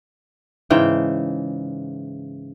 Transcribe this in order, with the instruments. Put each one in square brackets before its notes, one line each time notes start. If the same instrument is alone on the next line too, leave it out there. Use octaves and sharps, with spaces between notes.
[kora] G#2 C#3 E3 G5